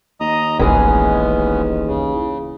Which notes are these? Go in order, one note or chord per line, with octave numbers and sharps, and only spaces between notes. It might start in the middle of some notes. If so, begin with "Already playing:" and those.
D#2 D#5 A#5 D#6
D1 A1 E3 G#3 B3 C#4 G#4
C#3